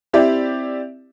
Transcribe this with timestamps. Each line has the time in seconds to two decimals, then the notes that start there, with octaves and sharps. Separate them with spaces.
0.13 C4 E4 G4 D5 E5